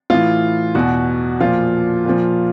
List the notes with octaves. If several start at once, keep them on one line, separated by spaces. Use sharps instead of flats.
A2 E3 F4
E2 B2 F#4
A#2 F3 F4
A#2 F3